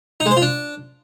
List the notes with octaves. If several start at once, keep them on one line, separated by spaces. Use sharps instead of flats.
D#4
G#3
C5
F4
D4